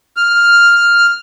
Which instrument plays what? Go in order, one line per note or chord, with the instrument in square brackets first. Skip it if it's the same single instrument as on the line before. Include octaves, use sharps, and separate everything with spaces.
[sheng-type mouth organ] F6